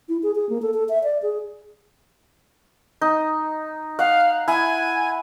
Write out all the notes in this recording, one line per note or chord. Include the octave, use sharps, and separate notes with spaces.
E4
G#4
G#4
A#3
A4
A4
E5
D5
G#4
D#4
F5 F#5
E4 G#5